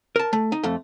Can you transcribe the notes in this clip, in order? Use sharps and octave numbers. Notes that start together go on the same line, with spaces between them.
A#4 A5
A3
D#4
F2 A3